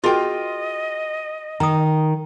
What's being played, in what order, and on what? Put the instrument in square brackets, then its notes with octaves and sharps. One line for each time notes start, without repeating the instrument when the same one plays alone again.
[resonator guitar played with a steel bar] F4 G5 [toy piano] F#4 G#4 A#4 [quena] D#5
[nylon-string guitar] D#3 [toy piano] A#5 D#6